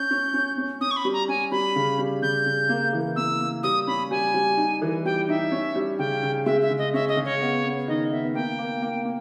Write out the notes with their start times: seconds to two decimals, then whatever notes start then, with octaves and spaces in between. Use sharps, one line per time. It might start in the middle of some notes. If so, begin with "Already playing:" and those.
Already playing: C#4 G6
0.11 C#4
0.34 C#4
0.58 C#4
0.81 C#4 D#6
0.91 C#6
0.97 B5
1.05 G3
1.13 A#5
1.28 C#4 G#5
1.51 G3 B5
1.76 C#3
1.99 G3
2.22 C#3 G6
2.46 C#3
2.69 A#3
2.93 E3
3.16 A#3 E6
3.40 A#3
3.63 G3 D#6
3.87 C#4 B5
4.11 G3 G#5
4.34 G3
4.57 D#4
4.82 E3
5.05 G3 G5
5.29 D#4 E5
5.52 C#4
5.75 G3
5.99 C#3 G5
6.23 C#3
6.46 G#3 E5
6.62 E5
6.70 C#3
6.78 D#5
6.94 C#4 E5
7.08 D#5
7.17 C#3
7.25 C#5
7.41 B3
7.64 B3
7.87 D#3 D#5
8.11 B3 E5
8.34 A#3 G5
8.58 A#3
8.82 A#3
9.05 A#3